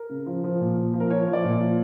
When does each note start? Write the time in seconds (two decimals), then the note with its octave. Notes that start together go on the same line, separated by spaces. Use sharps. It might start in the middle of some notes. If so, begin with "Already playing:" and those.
Already playing: A#4
0.10 C#3
0.26 F3
0.44 F3
0.60 A#2
0.78 A#2
0.93 F3
1.00 A#4
1.10 F3 C#5
1.27 F3
1.33 D5
1.44 A#2
1.60 F3